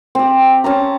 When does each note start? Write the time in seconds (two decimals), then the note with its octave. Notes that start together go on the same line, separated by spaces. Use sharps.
0.15 C4 G4
0.64 C#4 A5 A#5